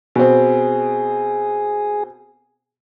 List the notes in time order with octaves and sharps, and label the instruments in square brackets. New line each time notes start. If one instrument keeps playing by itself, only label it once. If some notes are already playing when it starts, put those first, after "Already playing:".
[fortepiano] B2 C4 [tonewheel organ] G#4